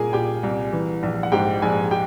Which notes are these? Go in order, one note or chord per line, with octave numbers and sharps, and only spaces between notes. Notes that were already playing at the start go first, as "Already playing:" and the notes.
Already playing: C2 A#2 G#4 A#4 G#5
A#2 G4 G5
C2
E3
A#1
F#5
G#2 G4 G5
A#1 G#4 G#5
G4 G5